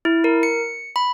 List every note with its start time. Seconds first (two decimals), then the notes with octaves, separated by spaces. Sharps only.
0.05 E4
0.24 A#4
0.43 C#7
0.96 B5